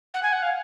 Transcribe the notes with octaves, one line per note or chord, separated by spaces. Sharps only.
F#5
G#5
F#5
F5